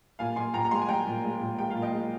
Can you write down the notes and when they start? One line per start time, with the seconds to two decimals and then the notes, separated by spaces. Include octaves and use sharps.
0.19 A#2 F5 G#5
0.36 A#2 G#5 C6
0.54 A#2 G5 A#5
0.65 A#5
0.71 G#3 G#5 C6
0.82 G#5
0.88 G#3 G5 A#5
1.07 A#2
1.24 G#3
1.41 A#2
1.59 G#3 G5
1.70 A#2 F5
1.82 D#5 G5
1.93 G#3